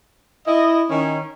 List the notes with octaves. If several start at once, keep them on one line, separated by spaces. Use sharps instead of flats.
E4 D#5
D#3 C#4